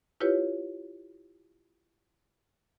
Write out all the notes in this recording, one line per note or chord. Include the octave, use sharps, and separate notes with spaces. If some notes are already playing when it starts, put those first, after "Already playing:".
E4 F4 G4 B4 C#5